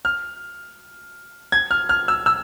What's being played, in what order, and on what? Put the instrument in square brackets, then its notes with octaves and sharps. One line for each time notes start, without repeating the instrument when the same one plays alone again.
[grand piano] F6
G#6
F6
F6
E6
E6